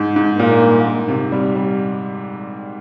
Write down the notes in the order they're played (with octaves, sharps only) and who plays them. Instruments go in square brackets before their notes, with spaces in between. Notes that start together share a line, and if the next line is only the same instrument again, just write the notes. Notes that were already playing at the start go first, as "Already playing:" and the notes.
Already playing: [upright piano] G#2
G#2
[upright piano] A#2 [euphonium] A#3
[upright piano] G2
G#2
C3
G3
G3